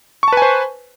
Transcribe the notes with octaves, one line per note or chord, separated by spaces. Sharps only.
B4 C5 G#5 A5 C#6